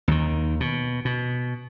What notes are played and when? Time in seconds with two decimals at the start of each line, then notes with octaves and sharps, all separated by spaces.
0.08 D#2 D#3
0.60 B2
1.05 B2